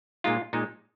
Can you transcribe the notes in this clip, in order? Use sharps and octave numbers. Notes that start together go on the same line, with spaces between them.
A#2 G#3 D#4 F4
A#2 G#3 D#4